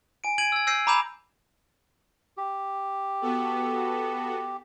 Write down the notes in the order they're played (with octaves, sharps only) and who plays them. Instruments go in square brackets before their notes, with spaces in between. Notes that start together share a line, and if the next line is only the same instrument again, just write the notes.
[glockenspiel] G#5 D7
G#6 D7 D#7 F#7
E6 G#6
E6 G6 A#6 C7 D#7
A#5 B5 D6 G6 E7 F7
[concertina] G4
[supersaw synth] B3 F#4 A4